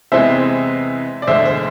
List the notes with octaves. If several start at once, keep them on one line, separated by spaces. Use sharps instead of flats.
E2 C3 E3 G#3 C4 C5 E5
D5
E1 D2 D3 G#3 C5 E5
C5